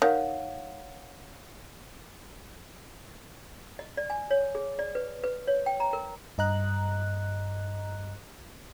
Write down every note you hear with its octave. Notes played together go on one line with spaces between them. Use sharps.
D#3 C#5 F5 F#5
D#5
D5
G#5
C#5
G#4
D5
B4
B4
C#5
G5
A#5
A#4
G2 D#5 A#5 F#6